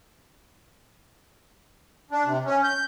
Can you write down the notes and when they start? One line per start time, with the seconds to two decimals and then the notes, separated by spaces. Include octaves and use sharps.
2.11 D4
2.24 C3
2.45 C#4
2.63 G6